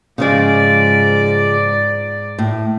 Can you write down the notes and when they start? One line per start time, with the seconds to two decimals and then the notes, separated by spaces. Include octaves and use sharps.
0.18 G#2 C#3 F3 G#3 D5
2.38 A2